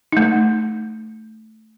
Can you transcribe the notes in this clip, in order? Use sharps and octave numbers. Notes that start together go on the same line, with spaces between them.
A3 D#4